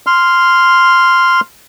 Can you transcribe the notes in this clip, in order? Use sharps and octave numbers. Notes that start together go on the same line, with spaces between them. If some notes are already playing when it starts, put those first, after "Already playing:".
C6 F6